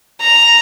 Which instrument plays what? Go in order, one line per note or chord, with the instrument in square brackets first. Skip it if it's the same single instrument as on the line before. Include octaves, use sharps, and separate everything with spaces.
[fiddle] A#5